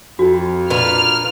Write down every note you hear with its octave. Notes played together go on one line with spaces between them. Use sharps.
F2 F#4
A#2 D4 B4 F6